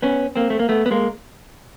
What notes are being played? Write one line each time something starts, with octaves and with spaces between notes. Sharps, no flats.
B3 C#4
A#3 C4
A3
A#3
A3 B3
B3
G#3 A#3